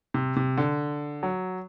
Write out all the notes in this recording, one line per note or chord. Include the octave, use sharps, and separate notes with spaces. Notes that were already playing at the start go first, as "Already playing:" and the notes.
C3
C3
D3
F#3